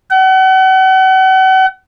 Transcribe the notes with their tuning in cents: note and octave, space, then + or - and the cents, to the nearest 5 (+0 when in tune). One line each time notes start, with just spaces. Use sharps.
F#5 +40